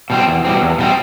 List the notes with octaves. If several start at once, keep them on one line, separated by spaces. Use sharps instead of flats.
B2 G3 C4
E2
B2 G3 C4
E2
B2 G3 C4